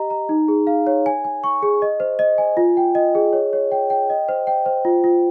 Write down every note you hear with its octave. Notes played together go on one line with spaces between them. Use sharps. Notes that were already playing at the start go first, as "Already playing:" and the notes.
Already playing: G4 D#5 A#5
A#5
D#4
G#4
F5
C#5
G#5
G#5
C#6
G#4
D#5
C5
D#5
G#5
F4
G5
D#5
G#4
C#5
C#5
G5
G5
D#5
C5
G5
C5
F4
F4